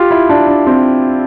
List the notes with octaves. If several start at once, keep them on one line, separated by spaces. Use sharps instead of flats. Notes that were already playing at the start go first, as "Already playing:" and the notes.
Already playing: F4 G4
E4
D4
D4
C4